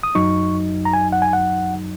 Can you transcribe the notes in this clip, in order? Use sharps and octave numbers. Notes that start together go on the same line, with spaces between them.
D#6
F#2 F#3 D#4 C#6
A#5
G#5
F#5
G#5
F#5